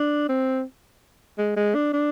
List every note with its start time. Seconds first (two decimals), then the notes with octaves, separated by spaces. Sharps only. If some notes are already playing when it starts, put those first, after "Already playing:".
Already playing: D4
0.29 C4
1.38 G#3
1.56 G#3
1.75 D4
1.93 D4